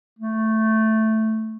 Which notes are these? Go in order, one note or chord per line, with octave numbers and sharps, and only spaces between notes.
A3